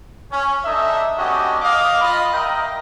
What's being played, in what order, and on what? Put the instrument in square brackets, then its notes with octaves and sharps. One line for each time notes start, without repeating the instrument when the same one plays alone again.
[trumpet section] C#4
D4 D#4 A4 D#5 E5
B3 C#4 D4 F#4 G4 D#5
D#5 F5 D6
F4 D#5 B5
A#4 D#5 E5 G5